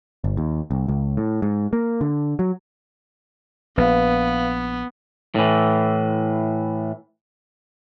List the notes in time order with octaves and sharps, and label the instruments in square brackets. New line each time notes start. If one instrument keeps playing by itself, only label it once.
[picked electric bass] G1
D#2
C2
C#2
A2
G#2
A#3
D3
F#3
[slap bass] A#1 [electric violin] B3 [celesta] B4 F5
[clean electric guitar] A2 E3